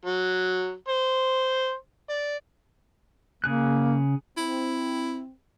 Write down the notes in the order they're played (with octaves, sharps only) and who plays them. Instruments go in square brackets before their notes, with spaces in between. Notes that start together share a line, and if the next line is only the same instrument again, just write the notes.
[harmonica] F#3
C5
D5
[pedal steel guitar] C#3 G#4 F#6 [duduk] A#3
[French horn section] C4 [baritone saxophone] E4